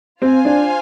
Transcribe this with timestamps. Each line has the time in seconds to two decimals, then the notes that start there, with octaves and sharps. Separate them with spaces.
0.22 C4 F4 C5 F5 G#5
0.45 D4